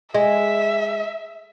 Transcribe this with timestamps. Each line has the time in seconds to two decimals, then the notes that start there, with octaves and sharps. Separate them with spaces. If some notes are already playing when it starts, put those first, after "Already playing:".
0.14 G#3 E5